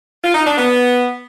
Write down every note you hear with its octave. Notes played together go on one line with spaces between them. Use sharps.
F4
D#4
D4
B3